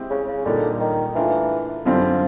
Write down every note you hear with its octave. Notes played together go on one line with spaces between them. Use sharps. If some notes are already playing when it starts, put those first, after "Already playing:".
Already playing: G#3 C4 E4 G4
C#3
C#3
A#2 D3 G3 A#3 D#4
D#3
E3 A3 D4 F4 A#4
F#2 D3 F3 G3 C4 F4